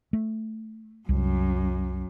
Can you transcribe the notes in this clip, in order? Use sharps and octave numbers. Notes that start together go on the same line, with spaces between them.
A3
C2 F#2